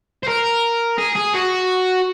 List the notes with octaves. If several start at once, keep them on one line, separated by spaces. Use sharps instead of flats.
C5
A#4
G#4
G#4
F#4